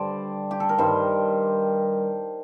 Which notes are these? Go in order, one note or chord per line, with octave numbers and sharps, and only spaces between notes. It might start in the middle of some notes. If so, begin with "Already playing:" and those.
Already playing: G2 D3 G3 C5 D5
G4
A4
A#4
G2 D#3 G3 C5